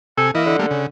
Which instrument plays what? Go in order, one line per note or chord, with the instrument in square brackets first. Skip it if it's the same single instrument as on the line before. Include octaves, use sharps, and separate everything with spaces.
[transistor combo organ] C3 G#5 [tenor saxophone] A4
[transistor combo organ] E3 E4 D#5 [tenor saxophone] A#3
[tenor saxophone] D3
[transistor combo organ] G3 A3 A#3
C#3